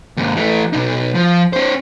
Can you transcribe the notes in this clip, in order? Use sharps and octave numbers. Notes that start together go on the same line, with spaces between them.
D#2 G#2
E3 A3
B2 D#4
F3
C#4 C5